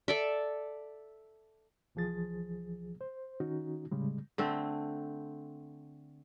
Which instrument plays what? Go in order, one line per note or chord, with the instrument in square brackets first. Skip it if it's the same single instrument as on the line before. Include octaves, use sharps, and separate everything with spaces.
[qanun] A4 D5 E5
[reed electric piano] C2 E3 F3 G#4 A6
C5
D#3 C#4 D#4 F#4
A2 C#3 G3 G#3
[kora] D3 A3 C4